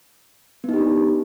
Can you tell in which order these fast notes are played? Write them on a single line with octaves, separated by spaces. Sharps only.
B3 D#4 G4 D4